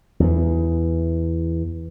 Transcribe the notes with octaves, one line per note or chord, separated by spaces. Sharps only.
E2 E3